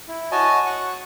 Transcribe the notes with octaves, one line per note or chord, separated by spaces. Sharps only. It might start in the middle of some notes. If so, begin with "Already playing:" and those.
E4
F#4 C#5 D#5 G#5 A5
F#5 C#6